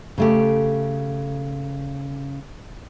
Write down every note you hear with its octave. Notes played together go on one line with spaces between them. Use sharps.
C#3 A3 G4